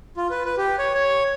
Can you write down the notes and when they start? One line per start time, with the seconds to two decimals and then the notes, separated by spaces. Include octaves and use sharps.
0.17 F4
0.30 B4
0.45 B4
0.58 G4
0.79 C#5
0.95 C#5